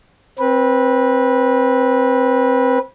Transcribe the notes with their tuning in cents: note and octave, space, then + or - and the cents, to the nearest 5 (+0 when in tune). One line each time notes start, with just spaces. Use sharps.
C4 +15 B4 -15